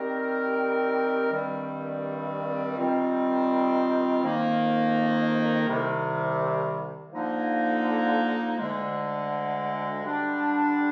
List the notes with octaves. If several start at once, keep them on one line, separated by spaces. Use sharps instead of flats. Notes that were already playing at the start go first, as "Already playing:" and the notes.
Already playing: D#3 G3 C4 G4 A#4
G2 D#3 G3 C4
D#3 G3 C4 F4
F2 D#3 A#3 D#4
C2 C3 D#3 G3
D3 F3 A#3 D#4
D2 D3 G#3
D3 G3 D4